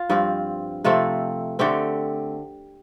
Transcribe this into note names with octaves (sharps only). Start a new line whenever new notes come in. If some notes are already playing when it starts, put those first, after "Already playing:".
Already playing: F4 F5
G2 F3 C4
C3 F3 A3 C4
D3 A3 C4 G4 G5